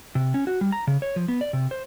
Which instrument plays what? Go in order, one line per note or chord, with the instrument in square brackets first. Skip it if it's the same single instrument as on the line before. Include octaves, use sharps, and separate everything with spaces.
[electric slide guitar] C3
C#4
F#4
G3
A#5
C#3
C#5
F3
B3
D5
C3
C5